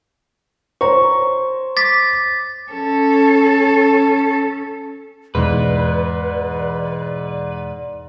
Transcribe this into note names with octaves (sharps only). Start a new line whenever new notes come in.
C5 C#5 A#5 C#6
D6 A6 B6
C#4 A4
E2 G#2 B2 E3 B4 D5